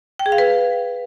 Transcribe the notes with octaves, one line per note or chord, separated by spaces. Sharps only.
G5
G#4
F5
B4